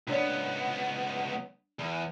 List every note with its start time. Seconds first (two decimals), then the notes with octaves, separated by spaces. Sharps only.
0.07 C#2 B3 D4 C#5 D5
1.79 E2